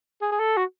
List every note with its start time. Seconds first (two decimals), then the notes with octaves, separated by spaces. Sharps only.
0.22 G#4
0.32 G#4
0.39 A4
0.57 F#4